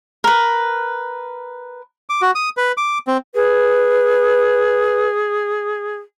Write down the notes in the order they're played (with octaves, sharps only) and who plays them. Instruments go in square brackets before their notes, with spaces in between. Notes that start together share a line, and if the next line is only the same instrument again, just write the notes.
[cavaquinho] A#4 B4
[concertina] D6
F#4
D#6
B4
D6
C4
[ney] G#4 [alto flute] B4